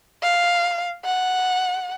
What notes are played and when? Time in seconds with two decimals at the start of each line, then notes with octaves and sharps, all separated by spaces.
0.23 F5
1.05 F#5